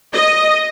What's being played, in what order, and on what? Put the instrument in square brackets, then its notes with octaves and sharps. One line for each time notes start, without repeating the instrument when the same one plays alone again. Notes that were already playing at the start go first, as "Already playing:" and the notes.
[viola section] D#5